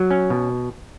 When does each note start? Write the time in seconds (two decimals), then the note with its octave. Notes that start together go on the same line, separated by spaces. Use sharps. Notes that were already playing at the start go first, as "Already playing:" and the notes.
Already playing: F#3
0.11 C#4
0.30 B2